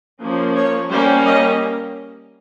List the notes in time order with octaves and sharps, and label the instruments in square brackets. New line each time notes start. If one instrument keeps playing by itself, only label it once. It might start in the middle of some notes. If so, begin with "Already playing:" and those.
[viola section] F3 A#3 C#4
C#5
G3 A#3 C#4 C5
D#5